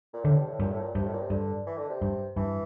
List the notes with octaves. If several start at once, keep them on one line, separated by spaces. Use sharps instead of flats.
A#2
A2 D3
G2
A2
G2 A#2
A2
A#2
G2 C3
A2
A#2
C3
G2 D3
E3
D3
C3
G2
G2 E3